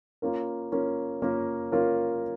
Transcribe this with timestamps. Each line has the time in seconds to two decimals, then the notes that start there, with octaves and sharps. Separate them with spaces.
0.22 A#3 C#4 F4 A#4
0.72 A#3 C#4 F4 A#4
1.22 A#3 C#4 F4 A#4
1.72 A#3 C#4 F4 A#4